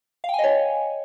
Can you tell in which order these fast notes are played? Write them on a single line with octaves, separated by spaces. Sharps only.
F5 G5 G#5 D#5 C#5